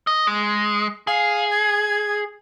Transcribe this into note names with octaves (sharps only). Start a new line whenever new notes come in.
D#5
G#3
G#4 F5
G#6